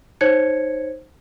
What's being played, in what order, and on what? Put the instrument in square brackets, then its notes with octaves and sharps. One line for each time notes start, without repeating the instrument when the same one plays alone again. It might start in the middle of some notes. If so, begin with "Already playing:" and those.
[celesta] D#4 C5 C#5 G#6 C#7